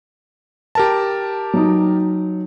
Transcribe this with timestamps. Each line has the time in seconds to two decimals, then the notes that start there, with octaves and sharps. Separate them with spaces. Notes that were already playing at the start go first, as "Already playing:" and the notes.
0.75 G4 A#4 A5
1.54 F#3 D#4